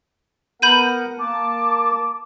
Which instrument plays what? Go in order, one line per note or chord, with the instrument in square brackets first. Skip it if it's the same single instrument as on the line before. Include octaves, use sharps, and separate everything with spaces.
[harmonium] B3 A#4 F#5 [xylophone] B5 G6 D#7
[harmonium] A#3 A5 [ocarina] D6